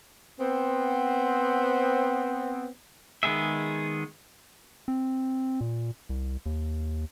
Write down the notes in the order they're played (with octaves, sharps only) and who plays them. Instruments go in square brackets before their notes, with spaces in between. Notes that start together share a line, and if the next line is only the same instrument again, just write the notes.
[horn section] B3 C4
[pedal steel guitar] D#3 G#3 B3 G#4 E5
[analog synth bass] C4
A#2
C2
D#2